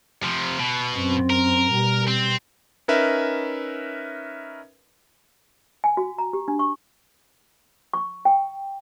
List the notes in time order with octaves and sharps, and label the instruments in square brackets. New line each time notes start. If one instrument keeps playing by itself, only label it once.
[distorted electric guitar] C3 F3
B2
[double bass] F#2 C4
[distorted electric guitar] A#4
[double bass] B2 G3
[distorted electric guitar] C4
[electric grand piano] C#4 D#4 A#4 B4 E5
[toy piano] G#5
F#4
A#5
G4
D4
C#6
C#6
G5